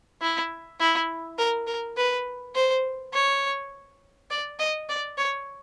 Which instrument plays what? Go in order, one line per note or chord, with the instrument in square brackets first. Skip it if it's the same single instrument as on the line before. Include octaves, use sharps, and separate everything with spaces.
[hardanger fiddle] E4
E4
A#4
A#4
B4
C5
C#5
D5
D#5
D5
C#5